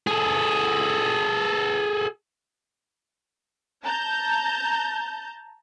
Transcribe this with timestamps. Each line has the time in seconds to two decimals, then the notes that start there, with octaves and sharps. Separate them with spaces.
0.07 G#4 A4
3.84 A5 A#5 G6